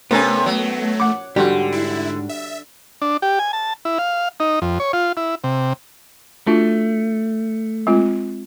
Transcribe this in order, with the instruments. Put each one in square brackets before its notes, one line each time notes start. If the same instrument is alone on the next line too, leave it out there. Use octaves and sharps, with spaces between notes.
[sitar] C3 C#4 [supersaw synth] A3 [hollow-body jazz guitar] B3 A#4 G#5
[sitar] F#3
[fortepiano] F#5 D6
[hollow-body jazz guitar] G#2 G4 [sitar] D3 [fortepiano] G3 F#4
[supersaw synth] E4
E5
[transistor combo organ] D4
G4
G#5
A5
E4
F5
D#4
F2
C#5
F4
E4
C3
[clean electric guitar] A3 [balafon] D4 F4 F#4
[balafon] G#3 C4 F4